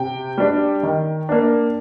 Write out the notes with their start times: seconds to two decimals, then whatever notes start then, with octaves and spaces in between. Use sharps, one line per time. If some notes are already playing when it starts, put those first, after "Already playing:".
Already playing: C3 G5
0.38 G3 D4
0.83 D#3
1.29 A#3 D4